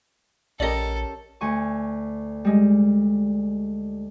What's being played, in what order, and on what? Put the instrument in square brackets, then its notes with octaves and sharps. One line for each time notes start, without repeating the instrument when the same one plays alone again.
[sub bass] A#1 [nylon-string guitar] C#4 G4 A#4 [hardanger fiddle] A4 [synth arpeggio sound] D5 D#5
[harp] D2 G#5 C#6
G3 G#3